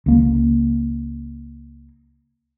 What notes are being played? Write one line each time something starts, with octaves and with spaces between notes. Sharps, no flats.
C#2 A#3